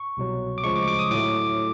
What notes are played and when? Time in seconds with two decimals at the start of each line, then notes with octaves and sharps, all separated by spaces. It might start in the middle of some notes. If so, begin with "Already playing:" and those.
Already playing: C#6
0.17 C2 B2 F#3
0.58 D6
0.64 D2 C#3 F3 G#3 C#6
0.76 D6
0.88 D6
0.99 D#6
1.11 A2 F#3 A3 D6